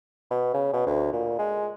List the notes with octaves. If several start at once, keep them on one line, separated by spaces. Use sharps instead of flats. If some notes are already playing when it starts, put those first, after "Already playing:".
B2
C#3
B2
D2
A#2
G#3